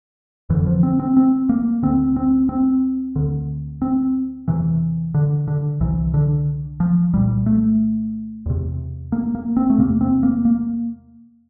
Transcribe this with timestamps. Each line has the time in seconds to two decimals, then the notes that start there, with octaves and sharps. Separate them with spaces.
0.50 F2 D3 E3
0.66 F3
0.83 C4
1.00 C4
1.17 C4
1.49 A#3
1.82 D2 D3 C4
2.16 C4
2.49 C4
3.16 D2 D3
3.82 C4
4.48 E2 C3 E3
5.14 D3
5.48 D3
5.80 C2 C3 E3
6.14 D3
6.80 F3
7.13 C2 A#2 G3
7.46 A3
8.46 E2 C3
9.12 A#3
9.35 A#3
9.57 C4
9.70 A3
9.78 E2 C3 A#3
10.01 C4
10.23 A#3
10.45 A#3